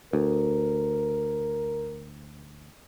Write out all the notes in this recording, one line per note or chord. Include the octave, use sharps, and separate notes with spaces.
D2 A#4